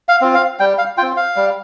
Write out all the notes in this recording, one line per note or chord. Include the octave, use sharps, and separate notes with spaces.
F5
C4 F4
F5
G3 G5
F5
C4 F4 G5
F5
G3